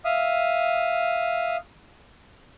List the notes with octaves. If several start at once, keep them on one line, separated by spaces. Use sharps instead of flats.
E5 F5 D#6